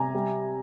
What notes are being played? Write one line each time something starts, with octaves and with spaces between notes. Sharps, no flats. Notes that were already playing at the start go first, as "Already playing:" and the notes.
Already playing: C3 G#5 A#5
G3